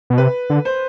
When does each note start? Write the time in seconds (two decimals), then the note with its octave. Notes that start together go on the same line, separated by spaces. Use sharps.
0.10 B2
0.18 C3 B4
0.50 D3
0.65 C5